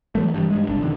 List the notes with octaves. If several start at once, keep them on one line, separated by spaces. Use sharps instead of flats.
E3 F#3 A3
G2 E3
G2 G#3
F#1 C2 D4
D#1 E2 D3 D#3